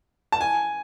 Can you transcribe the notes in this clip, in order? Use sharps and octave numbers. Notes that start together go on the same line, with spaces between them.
A5
G#5